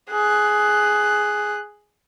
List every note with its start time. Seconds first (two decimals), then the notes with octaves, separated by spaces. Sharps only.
0.11 G#4 F#6